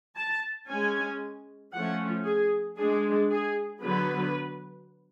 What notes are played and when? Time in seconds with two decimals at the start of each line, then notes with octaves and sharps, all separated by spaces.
0.16 A5
0.68 G#3 C#4 G#5
1.73 F3 A3 C#4 F#5
2.24 G#4
2.77 G#3 D4 G#4
3.30 G#4
3.81 D3 F#3 B3 B4